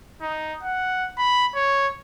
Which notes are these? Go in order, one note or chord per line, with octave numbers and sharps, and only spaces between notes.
D#4
F#5
B5
C#5